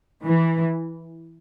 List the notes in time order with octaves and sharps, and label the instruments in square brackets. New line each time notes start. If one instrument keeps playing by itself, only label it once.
[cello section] E3